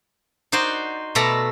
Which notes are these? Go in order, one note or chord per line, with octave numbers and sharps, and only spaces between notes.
D#4 F#4 C5 D5
B2 A3 A4 D5 A#5